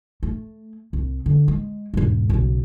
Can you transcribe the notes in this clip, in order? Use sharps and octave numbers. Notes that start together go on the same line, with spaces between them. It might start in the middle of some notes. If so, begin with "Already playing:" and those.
A3
C2
D3
G#3
E1 G#2
B1 C#3